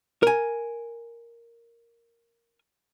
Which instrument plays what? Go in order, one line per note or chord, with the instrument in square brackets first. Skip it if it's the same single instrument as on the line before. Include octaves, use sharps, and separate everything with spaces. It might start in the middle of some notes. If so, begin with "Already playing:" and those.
[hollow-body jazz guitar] A#4 G#5